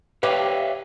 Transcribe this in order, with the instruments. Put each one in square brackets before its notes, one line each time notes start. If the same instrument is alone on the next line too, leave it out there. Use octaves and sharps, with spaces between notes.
[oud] G4 [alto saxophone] B4 [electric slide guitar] C#5 E5 F5